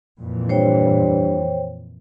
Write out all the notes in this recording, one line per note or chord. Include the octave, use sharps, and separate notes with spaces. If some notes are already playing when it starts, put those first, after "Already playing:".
F2 A#2 E3
G2 C5 C#5 G5